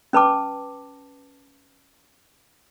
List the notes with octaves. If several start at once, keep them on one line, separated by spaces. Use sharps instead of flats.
C#4 B4 A5 D6